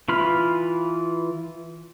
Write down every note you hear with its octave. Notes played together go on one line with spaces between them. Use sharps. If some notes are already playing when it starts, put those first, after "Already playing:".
E3 F4 B5 F6